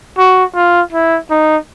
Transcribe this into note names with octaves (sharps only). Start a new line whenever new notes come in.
F#4
F4
E4
D#4